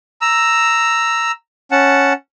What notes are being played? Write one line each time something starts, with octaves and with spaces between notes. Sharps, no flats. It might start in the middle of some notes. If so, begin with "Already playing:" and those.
A#5 E6
C#4 F#5 A5